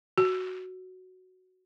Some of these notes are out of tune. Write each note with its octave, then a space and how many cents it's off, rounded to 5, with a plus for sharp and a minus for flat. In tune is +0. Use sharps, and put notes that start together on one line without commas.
F#4 +5